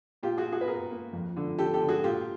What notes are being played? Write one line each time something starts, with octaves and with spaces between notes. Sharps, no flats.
A#2 F4 G4
F#4 G#4
A#2
F#4 G#4
B4
A#2 G#4 A#4
A#3
F2
D3
D3 G4 A4
G4 A4
D3
F#4 G#4
A#2 F4 G4